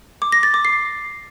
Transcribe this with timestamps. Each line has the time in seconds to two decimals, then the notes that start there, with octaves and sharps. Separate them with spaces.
0.22 D6
0.32 A#6
0.43 A6
0.54 D6
0.65 C7